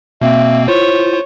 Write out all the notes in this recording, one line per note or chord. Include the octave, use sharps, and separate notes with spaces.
B2 A#3 C4 E5
E4 F4 C5 C#5